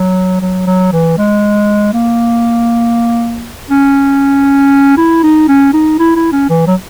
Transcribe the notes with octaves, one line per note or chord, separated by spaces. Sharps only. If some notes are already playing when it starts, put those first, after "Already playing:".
Already playing: F#3
F#3
F#3
E3
G#3
A#3
C#4
E4
D#4
C#4
D#4
E4
E4
C#4
E3
F#3